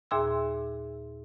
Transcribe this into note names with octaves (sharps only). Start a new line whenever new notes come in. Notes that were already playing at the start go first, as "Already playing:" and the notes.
D#2 A#2 G#4 E5 C6 E6